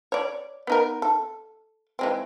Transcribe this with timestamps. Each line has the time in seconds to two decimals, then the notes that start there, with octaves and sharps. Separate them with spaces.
0.12 C#5 D5
0.67 B3 D#4 A#4
1.02 A4
1.99 E3 G#3 C4